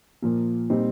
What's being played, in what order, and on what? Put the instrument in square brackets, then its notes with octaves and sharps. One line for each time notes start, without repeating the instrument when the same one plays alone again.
[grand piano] A#2 F3 A#3
A#2 G3 C4 D#4